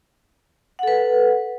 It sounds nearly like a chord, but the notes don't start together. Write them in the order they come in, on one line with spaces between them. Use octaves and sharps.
F#5 A4 B4